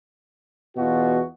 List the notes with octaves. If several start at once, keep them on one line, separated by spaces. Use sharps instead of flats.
E2 B2 F4 F#4